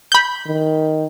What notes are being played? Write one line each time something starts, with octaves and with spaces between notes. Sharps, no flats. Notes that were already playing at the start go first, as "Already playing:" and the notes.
B5 G6
D#3